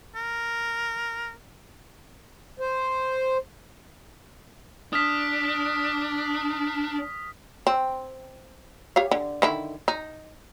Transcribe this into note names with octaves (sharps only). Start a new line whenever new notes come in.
A#4
C5
D4 D#6 F6 B6
C4
G4 C#5 F5
D3
D3 D#3 E4
D#4